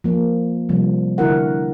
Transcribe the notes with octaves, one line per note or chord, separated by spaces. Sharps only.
F3 A#3
C3 F3 G3
D3 E4 F#4 A#4 F#5